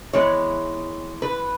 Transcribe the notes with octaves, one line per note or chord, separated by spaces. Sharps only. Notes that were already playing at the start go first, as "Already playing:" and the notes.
E3 G#3 B3 C#5
B4